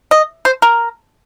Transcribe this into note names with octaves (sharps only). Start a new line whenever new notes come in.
D#5
C5
A#4